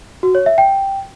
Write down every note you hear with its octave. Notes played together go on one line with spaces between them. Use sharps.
F#4
C#5
E5
G5